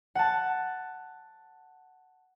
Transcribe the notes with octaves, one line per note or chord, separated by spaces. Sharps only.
F#5 A5